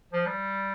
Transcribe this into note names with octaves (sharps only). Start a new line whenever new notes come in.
F3
G3